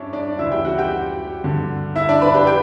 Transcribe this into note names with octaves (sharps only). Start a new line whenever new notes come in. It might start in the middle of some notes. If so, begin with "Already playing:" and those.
Already playing: G2 C#4 D4 E4 C#5 D5 E5
D4 D5
D2 C#3 E3 E4 E5
G4 G5
F#4 F#5
G4 G5
G2 D3
E4 E5
D4 D5
B4 B5
G4 G5
G4 G5